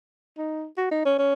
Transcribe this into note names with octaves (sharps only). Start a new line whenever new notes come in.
D#4
F#4
D#4
C#4
C#4